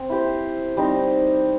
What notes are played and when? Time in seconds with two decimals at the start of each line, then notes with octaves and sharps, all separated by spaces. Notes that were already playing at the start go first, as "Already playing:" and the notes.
Already playing: C4
0.09 E4 G4 C5
0.77 G3 C4 D#4